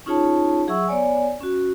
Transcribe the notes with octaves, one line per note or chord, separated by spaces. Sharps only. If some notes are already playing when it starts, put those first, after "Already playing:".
C#4 D#4 F4 G#4 C#5 A5
F#3 G#4 E5 F#5 C#6 E6
B3 C#5 D5 G#5
C#4 F#4